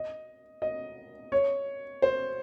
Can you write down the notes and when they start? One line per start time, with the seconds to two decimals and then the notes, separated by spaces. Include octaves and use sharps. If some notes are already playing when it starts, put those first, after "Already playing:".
Already playing: D#5
0.62 D#5
1.32 C#5
2.02 C5